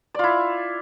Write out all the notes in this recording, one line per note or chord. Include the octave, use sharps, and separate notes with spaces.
E4 F4 D5